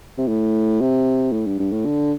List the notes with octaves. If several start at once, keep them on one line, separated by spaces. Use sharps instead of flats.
C3
A2
C3
A2
G2
G2
A2
D3